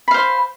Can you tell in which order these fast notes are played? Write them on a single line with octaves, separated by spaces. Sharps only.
B5 F5 C5